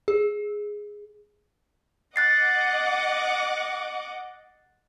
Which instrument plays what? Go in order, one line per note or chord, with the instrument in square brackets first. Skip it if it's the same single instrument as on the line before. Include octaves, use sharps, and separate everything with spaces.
[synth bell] G#4
[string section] D#5 F#5 D6 [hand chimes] F#6 A6 C7